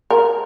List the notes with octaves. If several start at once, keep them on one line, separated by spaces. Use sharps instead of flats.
A#4